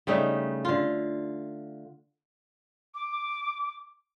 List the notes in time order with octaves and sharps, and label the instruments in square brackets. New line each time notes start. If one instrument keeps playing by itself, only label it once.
[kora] C#3 G3 A3 D#4
D3 F4
[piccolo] D6